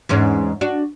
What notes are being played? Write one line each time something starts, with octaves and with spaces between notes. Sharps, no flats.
E2 G#2 C#4
D4 F#4